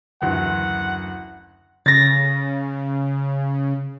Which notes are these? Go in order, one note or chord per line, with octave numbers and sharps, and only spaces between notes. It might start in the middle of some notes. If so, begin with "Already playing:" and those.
F#1 D2 E3 F#5
C#3 A6 A#6